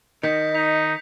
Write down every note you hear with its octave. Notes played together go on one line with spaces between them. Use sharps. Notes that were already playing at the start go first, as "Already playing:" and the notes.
D#3 D#5 G6 B6 C#7
D#4 B6 F7